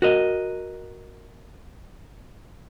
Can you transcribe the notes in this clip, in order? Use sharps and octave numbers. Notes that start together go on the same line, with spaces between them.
F#4 A#4 D#5